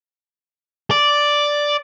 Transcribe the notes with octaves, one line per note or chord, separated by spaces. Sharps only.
D5